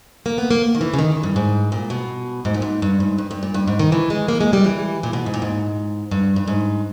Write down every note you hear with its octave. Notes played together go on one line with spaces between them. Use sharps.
A#3
B3
A#3
D#3
E3
C#3
D#3
G2
G#2
A#2
B2
G#2
A#2
G#2
G2
G#2
G2
G2
A#2
G2
G#2
D#3
E3
G#3
A#3
G#3
G3
E3
A#2
B2
G#2
A#2
G#2
G2
G2
G#2